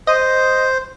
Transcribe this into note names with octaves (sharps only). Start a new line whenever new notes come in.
C5 D#5